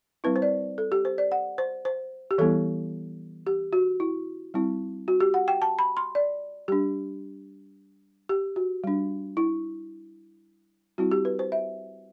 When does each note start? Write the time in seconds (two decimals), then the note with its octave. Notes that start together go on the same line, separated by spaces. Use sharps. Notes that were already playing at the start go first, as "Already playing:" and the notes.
0.24 G3 C4 E4 B4
0.36 C5
0.42 D5
0.78 A4
0.92 G4
1.05 C5
1.18 D5
1.32 F#5
1.58 C5
1.85 C5
2.31 G4
2.38 E3 G3 B3 E4 A4
3.47 G4
3.73 F#4
4.00 E4
4.54 G3 C4 E4
5.08 F#4
5.20 G4
5.34 F#5
5.48 G5
5.62 A5
5.79 B5
5.97 C6
6.15 D5
6.68 G3 D4 G4
8.29 G4
8.56 F#4
8.84 G3 D4
9.37 E4
10.98 G3 C4 E4 F#4
11.12 G4
11.25 B4
11.39 C5
11.52 E5